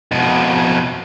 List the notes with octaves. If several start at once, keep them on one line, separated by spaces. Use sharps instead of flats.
F2 B2